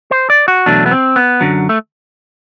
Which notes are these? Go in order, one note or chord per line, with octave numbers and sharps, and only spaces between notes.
C5
D5
F#4
E2 B2 F#3 A3 D4
B3
C4
B3
F#2 D3 F#3
A3